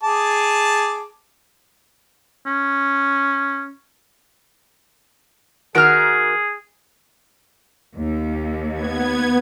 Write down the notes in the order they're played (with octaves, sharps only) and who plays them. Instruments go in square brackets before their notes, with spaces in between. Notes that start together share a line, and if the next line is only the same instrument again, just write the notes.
[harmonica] G#4 A5 D6
[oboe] C#4
[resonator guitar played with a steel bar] D#3 F#4 A#4 [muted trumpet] G#4 [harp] F6 D7
[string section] D#2
[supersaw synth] B3 G#6